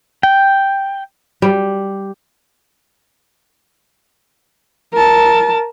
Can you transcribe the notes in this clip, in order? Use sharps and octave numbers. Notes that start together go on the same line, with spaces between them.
G5
G3
A#4 A5